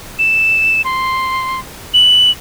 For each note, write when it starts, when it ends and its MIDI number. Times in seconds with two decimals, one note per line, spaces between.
0.19 0.82 100
0.85 1.60 84
1.94 2.31 102